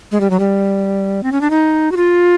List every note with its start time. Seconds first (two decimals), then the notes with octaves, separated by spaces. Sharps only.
0.12 G#3
0.20 G3
0.30 F#3
0.39 G3
1.23 C4
1.32 C#4
1.41 D4
1.50 D#4
1.92 F#4
1.97 F4